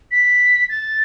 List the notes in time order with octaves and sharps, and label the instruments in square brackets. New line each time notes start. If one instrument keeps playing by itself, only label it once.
[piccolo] B6
A6